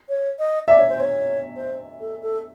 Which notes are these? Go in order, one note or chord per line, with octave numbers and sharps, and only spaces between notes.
C#5
D#5
D5 E5
C#5
C5
C#5
C5
A4
A4